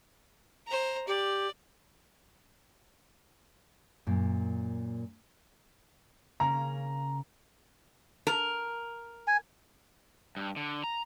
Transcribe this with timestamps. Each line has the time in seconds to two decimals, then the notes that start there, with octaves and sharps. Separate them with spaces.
0.67 C5 A#5
1.07 G4 D5
4.07 F#2 A#2
6.40 C#3 A#3 C#4 A#5
8.27 A#4
9.28 G#5
10.37 G2
10.56 D3
10.84 A#5